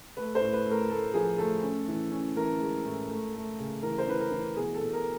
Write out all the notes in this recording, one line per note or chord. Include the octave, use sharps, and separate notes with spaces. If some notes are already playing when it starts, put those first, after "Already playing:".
A3 B4
C5
A2
B4
A3
A#4
A3 A4
F3 G#4
A3 A4
C#4
E3
C#4
E3 A#4
G#3
A2
A3
A3
C#3
E3 A#4
C5
E3 B4
A#4
E3
B2 G#4
A4
B2
A#4